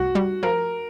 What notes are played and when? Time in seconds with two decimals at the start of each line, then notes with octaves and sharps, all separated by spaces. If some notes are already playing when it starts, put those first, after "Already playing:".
Already playing: C2 F#4
0.15 G3
0.43 F3 A#4